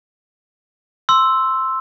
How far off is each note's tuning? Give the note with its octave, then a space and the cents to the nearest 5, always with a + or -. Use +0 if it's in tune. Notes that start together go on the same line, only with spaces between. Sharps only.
C6 +0 E6 +0